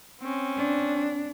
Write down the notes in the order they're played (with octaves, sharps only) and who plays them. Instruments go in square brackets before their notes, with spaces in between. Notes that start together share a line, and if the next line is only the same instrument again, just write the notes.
[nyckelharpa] C4 C#4
[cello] D4